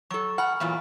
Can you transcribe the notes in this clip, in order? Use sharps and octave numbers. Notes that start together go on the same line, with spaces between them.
F#3 A4 C#6
F#5 G#5 B5 F6
E2 A#2 F#3